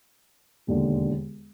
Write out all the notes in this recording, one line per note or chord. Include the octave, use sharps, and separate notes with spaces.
E1 D#2 D3